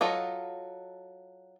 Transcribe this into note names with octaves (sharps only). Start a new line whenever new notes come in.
F#3 F4 A4 D#5